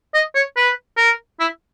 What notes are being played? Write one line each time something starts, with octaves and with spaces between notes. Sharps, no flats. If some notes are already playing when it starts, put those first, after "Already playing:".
D#5
C#5
B4
A#4
E4